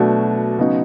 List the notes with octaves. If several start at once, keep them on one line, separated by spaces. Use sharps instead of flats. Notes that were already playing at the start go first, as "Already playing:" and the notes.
Already playing: B2 F#3 A3 D4 F#4
C#3 F#3 B3 D#4 F#4